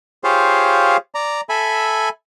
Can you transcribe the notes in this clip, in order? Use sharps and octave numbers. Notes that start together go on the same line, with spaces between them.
F4 G4 G#4 C5 C#5 F5
D5 A#5
A4 E5 G#5 B5